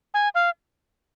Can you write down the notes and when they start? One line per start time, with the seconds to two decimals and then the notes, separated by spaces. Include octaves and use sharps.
0.14 G#5
0.35 F5